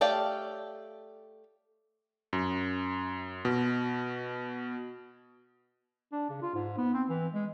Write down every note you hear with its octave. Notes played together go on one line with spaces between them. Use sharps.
A3 G4 C#5 D5 F5
F#2
B2
D4
C#3
F4
G#2
B3
C4
E3
G#3